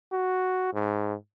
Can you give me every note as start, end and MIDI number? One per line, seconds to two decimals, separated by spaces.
0.12 0.71 66
0.74 1.15 44